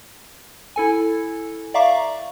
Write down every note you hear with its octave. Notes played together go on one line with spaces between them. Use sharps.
E4 A4 G#5
D5 E5 F5 A#5 C#6 D6